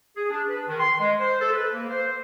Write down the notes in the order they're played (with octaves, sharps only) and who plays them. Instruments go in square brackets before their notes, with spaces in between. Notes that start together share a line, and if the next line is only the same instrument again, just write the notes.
[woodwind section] G#4
D4
B4
D#3
C6
G#3
C5
A4
B4
A#3
C5